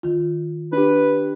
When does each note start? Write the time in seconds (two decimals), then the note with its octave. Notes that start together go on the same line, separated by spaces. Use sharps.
0.03 D#3 F4
0.72 D4 G4 B4